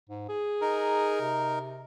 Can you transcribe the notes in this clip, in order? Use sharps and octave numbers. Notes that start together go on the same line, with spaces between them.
G#2
G#4
D#4 A#4
C3